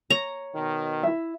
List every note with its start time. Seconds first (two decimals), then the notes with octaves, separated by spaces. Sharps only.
0.10 C#5 A#5
0.54 B2 D#3
1.03 E4 E5